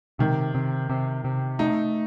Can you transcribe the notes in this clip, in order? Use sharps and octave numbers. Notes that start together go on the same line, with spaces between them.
C3 D#3
C3
C3
C3
A3 D#4